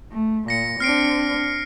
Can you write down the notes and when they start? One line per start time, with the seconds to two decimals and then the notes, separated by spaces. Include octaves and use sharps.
0.12 A3
0.48 A#2 A#6 C#7
0.80 C4 D4 F6 C7 D7